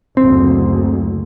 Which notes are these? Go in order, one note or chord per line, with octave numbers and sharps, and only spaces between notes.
F#1 D2 C4